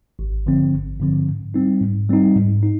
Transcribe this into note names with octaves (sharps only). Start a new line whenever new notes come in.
G#1
G2 D3 F3 C4
G#1
G2 D3 F3 C4
G#2
G3 C4 D#4
G#2
G3 C4 D#4
G#2
D#4